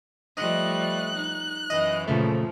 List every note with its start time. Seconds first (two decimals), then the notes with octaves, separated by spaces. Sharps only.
0.37 F3 G3 A3 D#5 F#6
1.15 D#4
1.70 F#2 E3 D#5
2.08 A#2 C#3 F3 A3